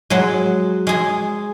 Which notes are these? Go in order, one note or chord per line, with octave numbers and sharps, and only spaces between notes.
F#3 G#3
G#3 G#4